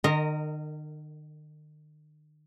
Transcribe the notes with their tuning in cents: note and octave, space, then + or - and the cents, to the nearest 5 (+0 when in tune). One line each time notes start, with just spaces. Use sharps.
D#3 -40 A#4 -20 D#5 +0